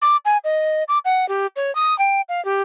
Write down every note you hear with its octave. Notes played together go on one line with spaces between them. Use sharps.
D6
G#5
D#5
D6
F#5
G4
C#5
D#6
G5
F5
G4